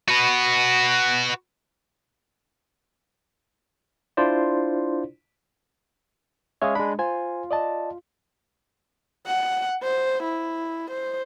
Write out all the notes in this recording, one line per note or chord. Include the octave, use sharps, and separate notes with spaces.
F#4 B4
D4 E4 F4 C5 D5
G#3 C#4 C#5 E5 F5 D#6
G#3 D4 B5
F4 C5 G#5
D5 D#5 A5
F#5
C5
E4
C5